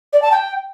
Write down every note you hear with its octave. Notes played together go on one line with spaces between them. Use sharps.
D5
A5
G5